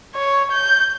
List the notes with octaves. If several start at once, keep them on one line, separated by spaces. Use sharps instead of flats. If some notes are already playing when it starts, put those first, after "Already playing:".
C#5
G6